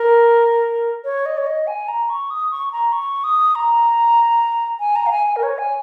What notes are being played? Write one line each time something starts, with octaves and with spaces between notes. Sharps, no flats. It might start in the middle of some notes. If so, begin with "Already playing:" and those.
Already playing: A#4
C#5
D#5
C#5
D#5
G#5
A#5
C#6
D#6
C#6
A#5
C#6
D#6
A#5
G#5
A#5
F5
G#5
G#5
A#4
C#5
G#5